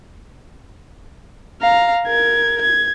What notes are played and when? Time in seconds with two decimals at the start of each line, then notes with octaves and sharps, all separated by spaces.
1.61 F5 A#5
2.06 A#4 G#6
2.62 G#6